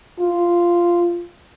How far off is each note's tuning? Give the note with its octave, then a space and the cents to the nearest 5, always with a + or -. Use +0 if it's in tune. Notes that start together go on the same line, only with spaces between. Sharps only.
F4 -10